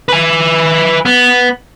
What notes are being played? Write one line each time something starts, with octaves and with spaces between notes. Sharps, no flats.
B4 G#5
B3